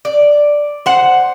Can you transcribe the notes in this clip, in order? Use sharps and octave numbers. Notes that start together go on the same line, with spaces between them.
D5
C5 F#5